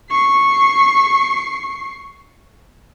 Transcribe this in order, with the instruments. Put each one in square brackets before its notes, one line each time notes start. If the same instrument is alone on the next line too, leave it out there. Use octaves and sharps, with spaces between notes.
[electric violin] C#6 C7